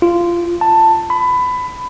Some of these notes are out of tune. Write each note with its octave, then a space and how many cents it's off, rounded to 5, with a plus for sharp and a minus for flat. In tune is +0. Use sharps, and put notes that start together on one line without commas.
F4 -15
A5 +15
B5 +20